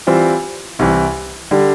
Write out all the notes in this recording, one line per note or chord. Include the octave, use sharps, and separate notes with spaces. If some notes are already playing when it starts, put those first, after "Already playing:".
E3 G3 C4 F4 C5
C2 C3 E3
D3 G3